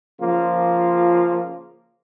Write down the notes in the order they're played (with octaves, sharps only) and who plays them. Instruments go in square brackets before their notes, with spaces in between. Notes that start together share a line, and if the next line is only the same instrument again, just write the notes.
[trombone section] C#3 F3 A#3 F4